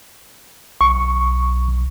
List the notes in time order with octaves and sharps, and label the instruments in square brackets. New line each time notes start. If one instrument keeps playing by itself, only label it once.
[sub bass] B1 [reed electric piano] C#6